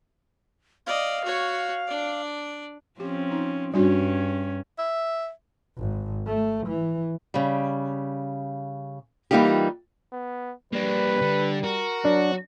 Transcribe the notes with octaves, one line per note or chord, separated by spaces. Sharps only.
D5 D#5 F5
F#4 C#5
D4 D5
F3 C4 C#4 G4
D#4
G2 G3 C#4 D4 F#4
E5
G#1
A3
E3
C#3 G3
E3 G3 A#3 D#4 F4 G4
B3
G3 A#3 D4 B4
D3
F#4 A#4
F#3 D4